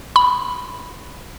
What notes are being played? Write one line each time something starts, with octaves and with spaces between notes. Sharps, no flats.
B5